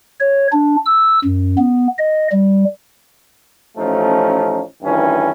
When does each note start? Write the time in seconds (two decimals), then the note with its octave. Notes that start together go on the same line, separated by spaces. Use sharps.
0.20 C#5
0.52 D4
0.85 E6
1.24 F#2
1.58 B3
1.98 D#5
2.32 G3
3.77 A1 F3 A3 C#4 D#4
4.82 D2 G2 D#3 E3 C#4